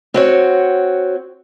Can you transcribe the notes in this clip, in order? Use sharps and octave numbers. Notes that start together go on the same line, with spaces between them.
C4 F#4 C#5